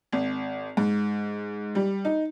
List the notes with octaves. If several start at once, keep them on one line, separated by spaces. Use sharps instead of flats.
G#1
G#2
G3
D#4